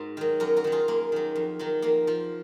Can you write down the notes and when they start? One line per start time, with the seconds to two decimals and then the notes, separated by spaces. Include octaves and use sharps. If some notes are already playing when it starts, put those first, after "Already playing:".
Already playing: G#2 F#4 A#4
0.17 D#3 F#3
0.40 F#2 F#4 A#4
0.56 F#4 A#4
0.64 D#3 F#3
0.72 F4 G#4
0.88 F#2 A#3
1.12 D#3 F#3
1.36 F2
1.59 D#3 F#3
1.82 F2 A#3
2.07 F3